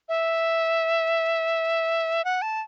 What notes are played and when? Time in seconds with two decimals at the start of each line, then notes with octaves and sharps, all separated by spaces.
0.09 E5
2.25 F#5
2.42 A5